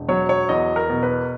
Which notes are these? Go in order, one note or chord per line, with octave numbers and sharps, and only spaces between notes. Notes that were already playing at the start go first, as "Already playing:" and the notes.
Already playing: E1
F#3 C#5
C#5
E2 D#5
A#4
B2
B4